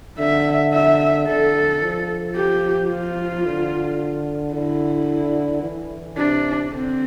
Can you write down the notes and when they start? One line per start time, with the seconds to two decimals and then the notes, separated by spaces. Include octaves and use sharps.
0.19 D3 E5
0.74 E5
1.27 D3 A4
1.82 F3
2.36 G4
2.91 F4
3.45 D3
4.54 D3 E4
5.62 E3
6.17 C3 D4
6.71 D3 C4